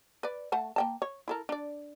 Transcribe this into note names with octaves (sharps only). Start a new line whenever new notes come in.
B4 D5
A3 F#5 A5
A#3 G5 A5
C#5
E4 A4 A#4
D4 D5